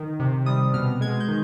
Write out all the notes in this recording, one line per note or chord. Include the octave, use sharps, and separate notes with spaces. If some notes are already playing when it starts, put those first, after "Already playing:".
Already playing: D#3
C3
G3 D#6
B2 F6
G#3 G#6
G6
D#3